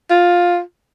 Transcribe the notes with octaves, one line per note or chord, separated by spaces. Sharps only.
F4